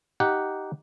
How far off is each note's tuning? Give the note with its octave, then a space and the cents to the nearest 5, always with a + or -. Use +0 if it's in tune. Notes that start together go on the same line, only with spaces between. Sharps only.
D#4 +0 G4 -15 F#5 -5